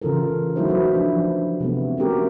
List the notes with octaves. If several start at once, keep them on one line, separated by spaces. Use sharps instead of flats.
C#3 E3 F4 A4 A#4
F#3 A3 D#4 E4 F#4 C5
A3 F#4 B4
F3 D4
C3 A3 B3
A3 A#3 C#4 F#4 G4 A#4